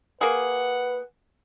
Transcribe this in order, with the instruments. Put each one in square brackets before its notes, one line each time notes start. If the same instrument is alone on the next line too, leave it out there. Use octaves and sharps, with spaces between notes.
[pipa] A#3 G#4 [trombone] B4 [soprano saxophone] F#5